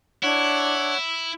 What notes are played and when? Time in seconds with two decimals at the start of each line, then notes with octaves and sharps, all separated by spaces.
0.23 D4 E4 C#5 F#5